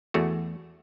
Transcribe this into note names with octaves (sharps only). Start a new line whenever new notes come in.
E2 A3 F#4